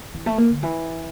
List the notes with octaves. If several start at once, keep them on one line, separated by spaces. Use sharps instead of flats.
E3
A3
A#3
D3
E3